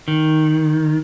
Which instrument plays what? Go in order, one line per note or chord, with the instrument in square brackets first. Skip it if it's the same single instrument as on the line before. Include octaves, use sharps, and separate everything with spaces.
[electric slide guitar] D#3